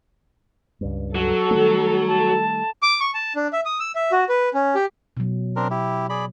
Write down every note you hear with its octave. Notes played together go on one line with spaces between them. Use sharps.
C#2 G2
F#3 A4
D#3 G3 A3
A5
D6
C#6
A5
D4
E5
D#6
E6
E5
F#4
B4
C#4
G4
B2 F#3
C4 D4 A#4
E4 G4
G#4 D5 B5